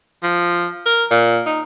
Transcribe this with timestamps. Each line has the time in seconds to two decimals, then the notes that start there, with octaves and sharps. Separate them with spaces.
0.23 F3
0.86 A#4
1.11 A#2
1.46 D#4